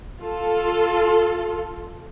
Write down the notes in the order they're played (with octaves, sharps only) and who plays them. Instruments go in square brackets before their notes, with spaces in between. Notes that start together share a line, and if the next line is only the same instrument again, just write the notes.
[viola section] F4 A4